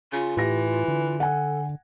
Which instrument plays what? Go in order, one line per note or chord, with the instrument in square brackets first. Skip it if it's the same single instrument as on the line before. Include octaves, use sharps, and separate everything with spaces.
[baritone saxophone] C#3 [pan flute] F4
[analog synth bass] A2 [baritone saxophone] E3 [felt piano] G4 A#6
[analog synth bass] D3
[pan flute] A4 [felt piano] F#5 G#5